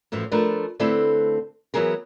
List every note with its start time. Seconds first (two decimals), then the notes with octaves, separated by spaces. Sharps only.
0.12 F#2 A2 E3 F3
0.32 F3 A3 D4 A#4 B4
0.80 D3 A3 C4 E4 A4 B4
1.74 E3 F#3 B3 G#4 A#4